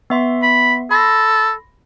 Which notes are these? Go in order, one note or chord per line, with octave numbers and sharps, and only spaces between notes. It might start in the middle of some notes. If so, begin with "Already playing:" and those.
B3 E5 C6
B5
A4 B5 C6 A#6